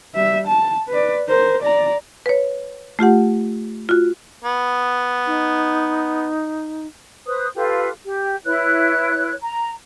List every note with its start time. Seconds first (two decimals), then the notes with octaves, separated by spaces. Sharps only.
0.15 G3 E5
0.47 A5
0.89 B4 D5
1.29 A#4 C5
1.62 D5 A#5
2.26 B4 C#5
2.99 A3 F4 G4 F#5
3.89 F4 F#4
4.44 B3
5.26 D#4
7.26 B4 C5 D#6
7.55 F4 G4 A4 B4
8.04 G4
8.44 E4 B4 C#5 F#6
9.41 A#5